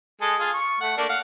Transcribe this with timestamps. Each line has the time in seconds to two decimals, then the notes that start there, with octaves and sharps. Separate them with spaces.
0.21 G#3 G#4 A4
0.39 F4 G#4
0.53 C#6
0.81 A3 F#5
0.97 A3 A#3 D4
1.09 F5 F#5